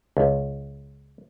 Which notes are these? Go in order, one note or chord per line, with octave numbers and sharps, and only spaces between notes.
C#2